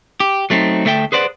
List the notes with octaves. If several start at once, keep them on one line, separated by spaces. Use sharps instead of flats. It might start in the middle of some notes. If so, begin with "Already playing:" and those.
G4
F#3 A3 C4 D#4
D2 A3 A4 E5 F#5 G5
G#4 B4 C5 D5 F#5